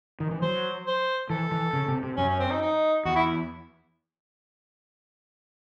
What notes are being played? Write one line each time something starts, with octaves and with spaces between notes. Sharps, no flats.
D#3
E3
F#3 C5
C5
E3 A4
E3
C#3
C3
C3
F#2 C#4
C#4
C4
D#4
D#4
E2 F#4
E4